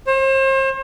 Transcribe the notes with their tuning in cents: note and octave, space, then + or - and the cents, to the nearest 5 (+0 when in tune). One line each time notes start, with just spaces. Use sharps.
C5 +40